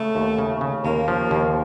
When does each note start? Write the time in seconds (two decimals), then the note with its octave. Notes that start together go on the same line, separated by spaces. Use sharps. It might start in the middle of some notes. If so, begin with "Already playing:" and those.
Already playing: C#3 A3
0.15 D#2
0.39 C#3
0.61 C#3
0.84 D#2 A#3
1.08 F3
1.31 D#2